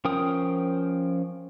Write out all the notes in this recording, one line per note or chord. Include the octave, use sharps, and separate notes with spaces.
F3 C#4 A#4 G5 D#6